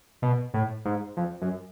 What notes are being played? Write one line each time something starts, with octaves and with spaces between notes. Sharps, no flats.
B2
A2
G#2
F2
F#2